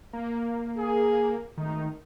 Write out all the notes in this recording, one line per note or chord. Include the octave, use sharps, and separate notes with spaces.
A#3
G#4
G#1 D#3 A3 D#4